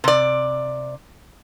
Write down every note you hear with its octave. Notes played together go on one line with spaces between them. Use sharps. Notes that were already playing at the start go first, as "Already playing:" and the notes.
C3 D5